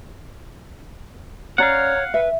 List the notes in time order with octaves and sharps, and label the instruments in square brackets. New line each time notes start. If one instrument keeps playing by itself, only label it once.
[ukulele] C#4 D5 A#5 [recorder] C#5 [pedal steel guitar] F5 F#5
[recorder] B4 [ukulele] E5